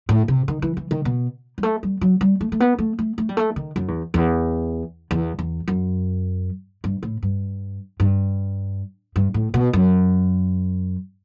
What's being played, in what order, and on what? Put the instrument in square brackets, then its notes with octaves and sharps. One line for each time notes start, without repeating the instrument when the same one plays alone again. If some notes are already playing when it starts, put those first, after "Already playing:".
[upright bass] A2
C3
D#3
E3
E3
D#3
B2
G3
A3
G3
F#3
G3
A3
A3
B3
A3
A3
A3
G3
A3
D#3
F#2
E2
E2
E2
E2
F#2
G2
A2
G2
G2
G2
A2
B2
F#2